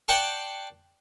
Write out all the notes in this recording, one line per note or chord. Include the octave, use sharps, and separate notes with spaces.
D5 F#5 G5 A5 C6 C#6